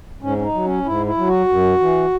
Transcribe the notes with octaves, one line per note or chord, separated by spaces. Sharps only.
G#2 C#4
C#4
D#4
F#3
C#4
G#2 E4
E4
F#3
F#4
F#2
E3